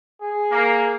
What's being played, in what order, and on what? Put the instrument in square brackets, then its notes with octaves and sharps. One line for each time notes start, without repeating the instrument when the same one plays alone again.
[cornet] G#4
[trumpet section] A#3